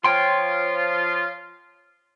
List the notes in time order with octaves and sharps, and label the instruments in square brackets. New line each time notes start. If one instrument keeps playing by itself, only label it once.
[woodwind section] F3 F4 [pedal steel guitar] C#5 G5 C6